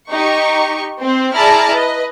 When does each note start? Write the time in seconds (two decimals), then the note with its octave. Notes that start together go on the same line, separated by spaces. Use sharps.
0.11 D#4 G4 C#6
1.00 C4 C5
1.36 E4 G#4 D5 A5 A#5 F6
1.75 B4 D#5